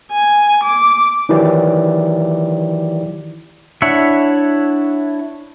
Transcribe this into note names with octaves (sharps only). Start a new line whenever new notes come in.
G#5
D6
D#3 E3 F#3 E4 G4 D5
D4 E4 C#5 E5 F#5